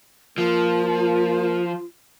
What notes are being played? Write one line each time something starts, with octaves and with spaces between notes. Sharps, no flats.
F3 A#3 F4